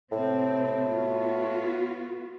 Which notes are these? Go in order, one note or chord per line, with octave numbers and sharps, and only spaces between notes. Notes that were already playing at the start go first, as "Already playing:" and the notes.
A2 C3 C4
B3 F4 F#4